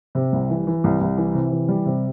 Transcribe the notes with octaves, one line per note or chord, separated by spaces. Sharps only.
C3
C2
E3
E3
C2
C2
E3
C3
E3
G3
C3